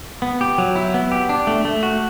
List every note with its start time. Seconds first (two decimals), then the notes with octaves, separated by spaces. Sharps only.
0.22 B3
0.41 G4
0.58 F#3
0.76 E4
0.94 B3
1.11 G4
1.29 D4
1.47 A3
1.65 A3
1.83 F#4